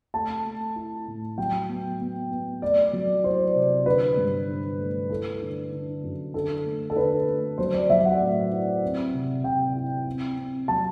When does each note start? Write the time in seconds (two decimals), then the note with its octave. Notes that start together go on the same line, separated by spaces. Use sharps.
0.14 A3 A5
0.45 A3
0.76 E4
1.07 A2
1.38 F#3 G5
1.69 B3
2.00 B3
2.31 B3
2.62 A3 D5
2.93 F#3
3.23 E4 C5
3.55 C3
3.86 D3 B4
4.17 G2
4.48 D3
4.79 A3
5.10 E4 A4
5.42 D3
5.72 D3
6.03 F#2
6.34 D3 A4
6.65 A3
6.90 A4
6.96 D3 B4
7.27 A3
7.58 F#3 C5
7.74 D5
7.90 F#3 E5
8.05 F#5
8.20 A2
8.52 E4
8.83 C4
9.13 C3
9.44 C3 G5
9.76 E4
10.06 C4
10.37 C4
10.68 F#3 A5